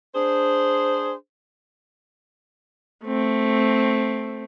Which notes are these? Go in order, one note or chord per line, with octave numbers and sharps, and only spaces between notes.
D4 G#4 C5
A3 C4